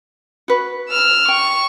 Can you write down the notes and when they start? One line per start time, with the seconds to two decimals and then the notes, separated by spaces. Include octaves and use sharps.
0.48 F#4 B4
0.89 E6 F6
1.28 G5 C#6